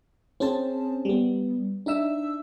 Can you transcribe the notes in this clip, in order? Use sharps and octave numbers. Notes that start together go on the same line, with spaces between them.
C4 C#4 G#4 C5 A5
G3 B3
D4 D#4 E5 E6